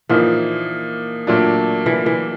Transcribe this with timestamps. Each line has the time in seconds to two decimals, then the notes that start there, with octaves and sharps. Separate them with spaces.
0.09 A#2 E3 F3 A#3 D#4
1.27 A#2 F#3 A3 D4
1.86 E3
2.06 E3